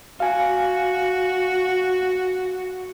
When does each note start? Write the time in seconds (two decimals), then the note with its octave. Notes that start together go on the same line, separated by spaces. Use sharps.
0.20 F#4 F5 G#5